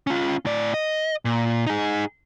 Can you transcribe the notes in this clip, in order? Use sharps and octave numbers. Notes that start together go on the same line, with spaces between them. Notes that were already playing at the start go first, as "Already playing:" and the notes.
C#4 F4
A2 D5
D#5
A#2
D#4 G#4